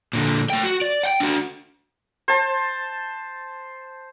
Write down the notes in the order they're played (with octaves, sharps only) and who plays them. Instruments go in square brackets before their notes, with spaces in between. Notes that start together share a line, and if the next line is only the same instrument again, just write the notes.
[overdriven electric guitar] A#2 D3
A3 G5
F#4
D5
F#5 G5
D4 F#4
[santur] C5 A5